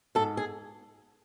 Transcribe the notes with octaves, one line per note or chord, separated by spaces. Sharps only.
G#2 A4
G#4